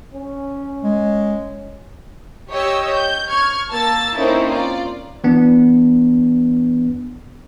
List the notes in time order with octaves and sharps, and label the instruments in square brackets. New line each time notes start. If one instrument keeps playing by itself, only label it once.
[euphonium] C#4
[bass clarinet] G#3
[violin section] G4 C#5 D#5 E6
G6
C#6 F6 G#6
A#3 A5 E6 A6
A#3 C4 C#4 D#4 E4 A4
F4 D5
[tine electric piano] E3 B3 D4